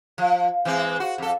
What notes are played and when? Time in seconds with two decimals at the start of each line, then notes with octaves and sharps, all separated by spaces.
0.18 F3
0.65 E3 G#3 C4
1.00 F#4
1.18 F2 A4